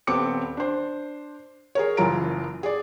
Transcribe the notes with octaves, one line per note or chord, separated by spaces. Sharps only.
D#1 B3 C4 D6 C#7
D4 C5
G#4 A#4 C#5
F#1 F#2 E3 F4 A#5 D7
G#4 D5